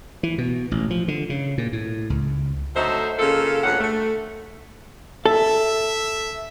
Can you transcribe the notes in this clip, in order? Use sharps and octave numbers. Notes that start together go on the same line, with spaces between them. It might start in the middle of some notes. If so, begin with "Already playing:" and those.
E3
B2
A1
F3
D3
C#3
A#2
A2
C#2
D3 F#3 A3 D#4 C5 E5
C#3 A#3 F4 A4
D2 G2 A#2 C#4 F#5
A3
A4 E5